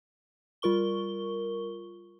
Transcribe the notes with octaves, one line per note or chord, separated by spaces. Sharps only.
G3 F4 A#4 C#6 G7